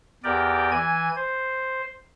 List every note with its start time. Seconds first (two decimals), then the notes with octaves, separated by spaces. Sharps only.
0.24 E2 G4 A#4 D5 G5
0.71 E3 G#5 G#6
1.15 C5